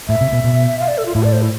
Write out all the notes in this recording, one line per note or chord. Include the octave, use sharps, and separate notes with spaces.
A2 E5
C3
B2
B2
F5
D5
A4
F4
A2 E4
D5
C5
E4